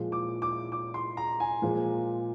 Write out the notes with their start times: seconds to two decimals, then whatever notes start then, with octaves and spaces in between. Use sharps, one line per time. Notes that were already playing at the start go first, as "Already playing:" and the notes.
Already playing: A#2 F3 G#3
0.12 D6
0.42 D6
0.72 D6
0.94 C6
1.17 A#5
1.40 G#5
1.62 A#2 F3 G#3